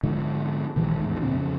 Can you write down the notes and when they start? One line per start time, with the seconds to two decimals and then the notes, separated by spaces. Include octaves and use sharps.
0.03 G#2 D3 F3
0.76 A#1 D#3 E3 G3
1.00 A1 E2 G#2
1.21 D2 A#2 D3 C4
1.34 F2 C#3 F3